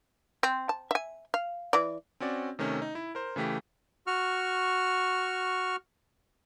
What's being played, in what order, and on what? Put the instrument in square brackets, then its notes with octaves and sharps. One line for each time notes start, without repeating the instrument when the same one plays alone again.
[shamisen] C4
A5
E5 G#5
F5
E3 D5
[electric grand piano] C4 C#4 F#4 D5
C3 D#3 A3 C#4
D#4
E4
A#4 C5
C#3 E3 A3 G4 B6
[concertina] F#4 C#6 F6